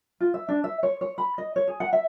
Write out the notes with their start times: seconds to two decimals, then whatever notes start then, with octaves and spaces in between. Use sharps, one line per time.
0.20 F4
0.34 E5
0.49 D4
0.64 E5
0.83 C#5
1.01 C#5
1.18 B5
1.38 D#5
1.56 C#5
1.68 G#4
1.80 F#5
1.93 E5